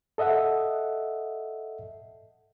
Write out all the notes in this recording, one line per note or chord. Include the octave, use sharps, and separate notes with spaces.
A4 D#5 E5 F#5